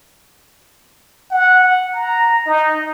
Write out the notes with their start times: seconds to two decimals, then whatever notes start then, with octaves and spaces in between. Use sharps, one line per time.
1.32 F#5
1.94 A#5
2.46 D#4